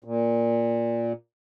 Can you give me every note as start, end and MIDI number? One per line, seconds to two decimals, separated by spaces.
0.04 1.13 46